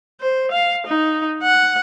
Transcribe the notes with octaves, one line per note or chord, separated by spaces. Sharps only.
C5
F5
D#4
F#5